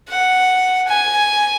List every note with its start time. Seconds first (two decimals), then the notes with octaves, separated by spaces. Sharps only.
0.09 F#5
0.88 G#5